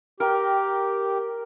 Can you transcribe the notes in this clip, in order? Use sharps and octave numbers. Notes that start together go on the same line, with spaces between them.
G4 A#4 G5